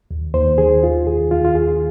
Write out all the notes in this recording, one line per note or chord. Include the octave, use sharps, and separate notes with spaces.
D#2
D#2 C5
D#3 G#4
D#2 F4
D#2 G#4
D#3 F4
F4
D#2 G#4